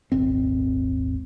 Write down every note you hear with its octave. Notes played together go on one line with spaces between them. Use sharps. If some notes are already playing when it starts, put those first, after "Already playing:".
D#1 G#1 C4